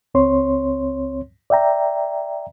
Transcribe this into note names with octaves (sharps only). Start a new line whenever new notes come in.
C#2 C4 C#5 C6
D5 E5 G5 A#5